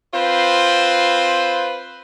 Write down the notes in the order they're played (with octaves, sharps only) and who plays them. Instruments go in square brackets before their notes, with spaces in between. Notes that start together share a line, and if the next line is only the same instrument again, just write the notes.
[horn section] C4 F4 B4 C5